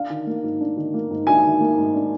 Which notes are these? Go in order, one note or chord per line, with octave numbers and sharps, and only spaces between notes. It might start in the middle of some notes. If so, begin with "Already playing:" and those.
Already playing: D4 F5
D#3
A#3
G#2
D4
D#3
A#3
G#2
D4 G#5
D#3
A#3
G#2
D4